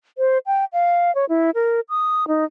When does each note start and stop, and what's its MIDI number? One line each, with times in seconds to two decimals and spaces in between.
0.18 0.38 72
0.46 0.65 79
0.73 1.14 77
1.15 1.25 73
1.29 1.50 64
1.55 1.80 70
1.89 2.28 87
2.28 2.45 63